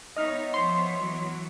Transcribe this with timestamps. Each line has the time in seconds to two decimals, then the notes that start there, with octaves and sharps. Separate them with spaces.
0.17 B3 D#4 C#5 D#5 E5 F6
0.54 F3 C5 C6
0.98 E3 F#3